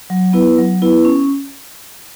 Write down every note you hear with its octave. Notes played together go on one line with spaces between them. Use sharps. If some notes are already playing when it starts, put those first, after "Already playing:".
F#3
B3 E4 B4
F#3
B3 E4 B4
C#4